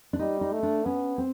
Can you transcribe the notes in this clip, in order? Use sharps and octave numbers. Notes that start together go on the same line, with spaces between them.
D4
G3 D#4
D#4
A3
D4
B3 C#4
C4